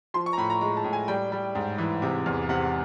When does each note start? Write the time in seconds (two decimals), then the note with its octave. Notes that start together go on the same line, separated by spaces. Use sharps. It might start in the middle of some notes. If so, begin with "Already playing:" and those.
0.14 F3 C6
0.26 C#6
0.33 A#5
0.38 A2 B5
0.50 A#5
0.61 G#3 A#5
0.77 A5
0.84 A2
0.93 G#5
1.08 G3 G5
1.32 G3
1.55 G#2
1.78 E3
2.02 C3
2.26 E2
2.49 C3 F#5